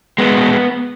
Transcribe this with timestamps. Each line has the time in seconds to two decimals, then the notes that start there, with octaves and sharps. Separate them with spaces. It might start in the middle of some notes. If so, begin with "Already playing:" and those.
0.18 G#3 B3
0.36 B2